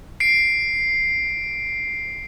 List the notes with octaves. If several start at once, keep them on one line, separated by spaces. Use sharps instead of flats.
C7 D7